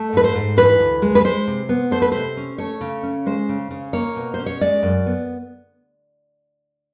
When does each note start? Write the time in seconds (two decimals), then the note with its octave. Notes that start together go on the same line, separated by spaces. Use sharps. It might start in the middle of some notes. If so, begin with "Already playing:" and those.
Already playing: A3
0.13 G#2 B4
0.24 C5
0.35 G#2
0.57 E3 B4
0.79 D2
1.02 G#3
1.15 B4
1.24 G#3 C5
1.47 C3
1.69 B3
1.91 A3 C5
2.02 B4
2.12 C3 C5
2.37 C#4
2.58 A3 C#5
2.81 C#3
3.03 C#4
3.26 G#3 C5
3.49 C#3
3.71 C#3
3.93 A#3 C#5
4.16 B2
4.34 C5
4.39 C#4
4.46 C#5
4.61 G#3 D5
4.83 F#2
5.06 B3